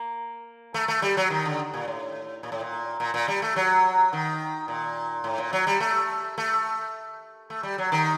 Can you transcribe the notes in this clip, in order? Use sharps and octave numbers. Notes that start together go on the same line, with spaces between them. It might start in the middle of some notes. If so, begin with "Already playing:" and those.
Already playing: A#3
A3
A3
G3
F#3
D#3
D3
A#2
A2
A#2
A2
A#2
A#2
A#2
G3
A3
F#3
D#3
A#2
A2
A#2
F#3
G3
A3
A3
A3
G3
F#3
D#3